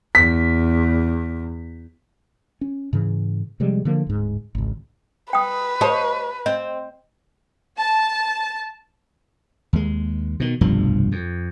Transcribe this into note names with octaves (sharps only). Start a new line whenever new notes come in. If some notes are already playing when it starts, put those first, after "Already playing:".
E2 B6
C#4
G#2 C#3 E3
C3 F3 G3 G#3
D3 F3 A#3
D1 G#2
G#1 C#2
B4 G5 D#6
G4 C5 C#5 D#5 A5
C4 D#5
A5
D#2 G#3
B2 D#3
F1 B1 G2 F3
F2